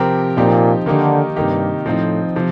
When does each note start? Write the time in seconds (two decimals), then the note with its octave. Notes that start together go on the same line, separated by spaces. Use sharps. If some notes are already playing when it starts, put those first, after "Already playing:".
Already playing: C3 F3 C4 G4 A#4
0.37 A#2 F3 C4 D#4 G4
0.86 D3 D#3 A#3 D#4 G4
1.36 G2 C3 D#3 A#3 D#4 G4
1.86 A2 F3 C4 D#4
2.36 C3 F3